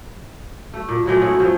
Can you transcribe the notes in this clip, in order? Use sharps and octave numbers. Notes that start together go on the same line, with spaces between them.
A3
A#2
A#2 F#3 G#3 A3
B3 C#4 E4
F3 F#3 A3